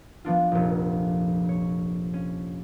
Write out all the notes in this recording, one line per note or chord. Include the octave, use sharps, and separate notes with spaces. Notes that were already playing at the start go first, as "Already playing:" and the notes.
F3 B3 D4 F4
F1 A#1
C#5
C#4